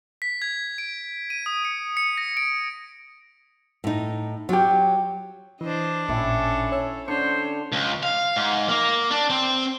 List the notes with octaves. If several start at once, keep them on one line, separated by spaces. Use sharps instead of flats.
B6
G#6
D7
D#7
D#6
C#7
C#7
A#6
D7
A2 D#4
F#3 F4 G4
E3 D4 C5 D#5
A1 A#2 C#4 E4 A4 G5 D6
C#5 E6
D3 C#4 D4 C5 C#5 G6 C#7
C#2
F5
G#2
A#3
D4
C4